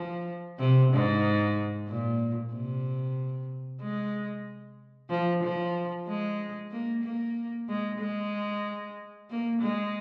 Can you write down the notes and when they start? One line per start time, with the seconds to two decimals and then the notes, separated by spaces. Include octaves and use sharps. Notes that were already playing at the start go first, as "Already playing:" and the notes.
Already playing: F3
0.60 C3
0.93 G#2
1.88 A#2
2.53 C3
3.82 G#3
5.10 F3
5.43 F3
6.08 G#3
6.72 A#3
7.04 A#3
7.69 G#3
8.00 G#3
9.30 A#3
9.62 G#3